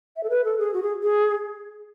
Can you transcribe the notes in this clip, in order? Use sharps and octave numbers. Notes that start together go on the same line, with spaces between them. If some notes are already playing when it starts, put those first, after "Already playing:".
E5
A4
B4
A4
G#4
F#4
G#4
G#4